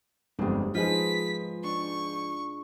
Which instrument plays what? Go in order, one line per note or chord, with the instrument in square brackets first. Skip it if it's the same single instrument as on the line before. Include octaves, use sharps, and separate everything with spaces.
[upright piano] G1 F2 G3 [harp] G#2 G#3
[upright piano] F3 D#4 G#4 [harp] F4 B4 [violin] B6
[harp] D4 [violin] C#6